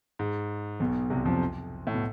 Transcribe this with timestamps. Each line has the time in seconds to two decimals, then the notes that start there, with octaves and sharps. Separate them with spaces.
0.19 G#2
0.80 B1 B2
1.10 C2 C3
1.25 F2 F3
1.87 A2
1.94 B2